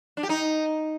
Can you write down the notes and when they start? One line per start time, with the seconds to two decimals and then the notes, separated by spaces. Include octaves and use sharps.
0.17 D4
0.23 G4
0.29 D#4